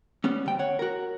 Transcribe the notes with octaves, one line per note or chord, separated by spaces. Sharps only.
G3 B3 C#4
D2 G5
C#5 F#5
F#4 A#4